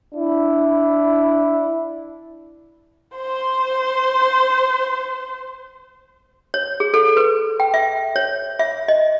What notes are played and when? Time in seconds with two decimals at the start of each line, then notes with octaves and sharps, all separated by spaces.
0.15 D4 E4
3.16 C5 C6
6.54 C#5
6.80 G#4
6.94 A4
7.17 B4
7.60 G5
7.74 E5
8.16 C#5
8.59 E5
8.88 D#5